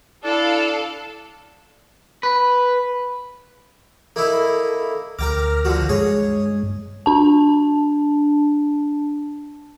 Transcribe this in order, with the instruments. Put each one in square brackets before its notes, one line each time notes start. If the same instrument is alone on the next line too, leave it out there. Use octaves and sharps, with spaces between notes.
[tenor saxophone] D4 [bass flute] E4 [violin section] A4 F5
[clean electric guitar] B4
[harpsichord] A#3 D#4 E4 [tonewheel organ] A4
[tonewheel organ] D2 F6 A#6 [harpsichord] A#4 G5 D6
[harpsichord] D3 F3 F#4
[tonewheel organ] G2 G#3 [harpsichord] G#4 C#5
[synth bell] D4 A5